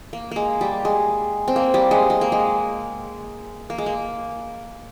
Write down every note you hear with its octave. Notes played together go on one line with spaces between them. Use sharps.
A#3
G#3 A#3
G3
G#3
C4
A#3
G3
G#3
G#3
A#3
G#3
A#3
G#3
A#3